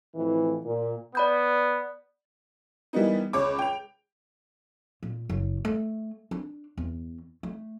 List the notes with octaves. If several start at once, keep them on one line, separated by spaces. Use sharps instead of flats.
F2 A2 E3
A#2
B3 D5 B5 G6
E3 G3 A#3 B3 D#4
C#2 C#5 D6
G5 F7
A#2
F#1
A3
D4
E2
A3